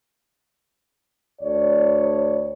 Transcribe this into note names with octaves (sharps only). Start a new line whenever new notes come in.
D2 C#5 D5